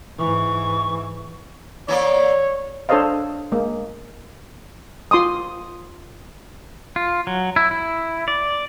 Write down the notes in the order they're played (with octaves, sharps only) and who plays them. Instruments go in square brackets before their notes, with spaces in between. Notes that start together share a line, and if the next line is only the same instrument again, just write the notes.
[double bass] G#2 E3 [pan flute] C#6
[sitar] E3 A#3 D5 [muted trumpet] C#5
[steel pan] D4 A4 C5 C#5 D#5 F5
G#3 A#3
F4 C6 D6 D#6
[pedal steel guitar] F4
F#3
E4
E4
D5